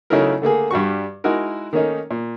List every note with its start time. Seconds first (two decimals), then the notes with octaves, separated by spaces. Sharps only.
0.10 C#3 F#3 A3 D#4 E4 A#4
0.42 D3 A3 A#3 G#4
0.71 G2 G3 F#4 C#6
1.24 G#3 D#4 E4 F#4 A#4
1.73 D#3 A3 A#3 C#4 D#4
2.11 A#2